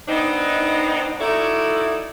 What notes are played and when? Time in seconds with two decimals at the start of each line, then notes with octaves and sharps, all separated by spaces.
0.08 B3 C4 D4 D#4
1.20 D#4 E4 F#4 A4 D5